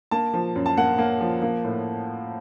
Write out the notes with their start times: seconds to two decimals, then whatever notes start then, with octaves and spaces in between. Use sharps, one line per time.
0.11 A#3 A5
0.34 F3
0.56 F#2
0.66 A5
0.77 A#3 F#5
0.98 A#3
1.21 F3
1.42 A#3
1.65 A2